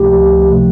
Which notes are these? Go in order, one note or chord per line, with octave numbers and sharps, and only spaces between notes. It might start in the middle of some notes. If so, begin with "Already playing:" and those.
Already playing: C#2 C3 F3 A3 G4
C3 F3 A3